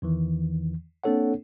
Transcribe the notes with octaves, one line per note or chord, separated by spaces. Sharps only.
E2 D#3 E3
A#3 C4 D4 A4 C#5 F#5